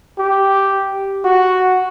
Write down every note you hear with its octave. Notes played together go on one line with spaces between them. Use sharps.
G4
F#4